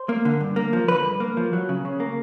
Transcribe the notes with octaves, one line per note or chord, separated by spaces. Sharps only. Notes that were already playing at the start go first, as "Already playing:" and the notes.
Already playing: C5
A#3
D3
G2
A#3
F3
D3 B4
G2
A#3
F3
F#3
C#3
C#3
A#3